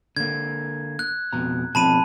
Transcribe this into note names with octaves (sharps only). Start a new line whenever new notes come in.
D3 A#3 G#6
F#6
F2 B2 A#5
B2 F3 C4 A5 B5 D#7